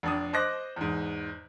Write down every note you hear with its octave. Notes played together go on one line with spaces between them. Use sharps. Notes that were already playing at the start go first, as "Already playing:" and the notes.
F1 D4 D#6
C5 D#5 D6 F#6 A#6
E2 G#2